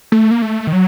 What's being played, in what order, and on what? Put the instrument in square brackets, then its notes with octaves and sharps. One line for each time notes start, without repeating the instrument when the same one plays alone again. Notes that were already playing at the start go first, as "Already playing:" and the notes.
[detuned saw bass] A3
A#3
A3
D#3
F#3